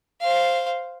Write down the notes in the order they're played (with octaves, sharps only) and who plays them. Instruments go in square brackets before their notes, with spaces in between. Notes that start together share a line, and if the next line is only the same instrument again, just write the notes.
[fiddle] C5 F5